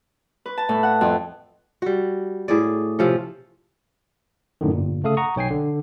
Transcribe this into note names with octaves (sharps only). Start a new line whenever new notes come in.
B4
A5
A2
F#5
F2
G3 F#4
A2 G#4 D5
C3 F3 C#4
F#2 A2 D3 D#3
G1 A#2
C#3 A3 A4 F5 D#6
F#5 A#5 C#6 D#6
B1 C#5 G5 G#5 C7
D3